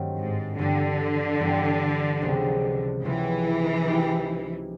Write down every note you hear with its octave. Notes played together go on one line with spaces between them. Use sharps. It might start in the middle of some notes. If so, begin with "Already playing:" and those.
Already playing: G2 D#3 F#3 A3 C4
G#2
G2 D3 E3 G3 B3 D4
G2 E3 G3 B3 D4
C#2 C3 F3 G#3 B3
C#2 C3 E3 F3 G#3 B3
F3 A#3 D#4 G4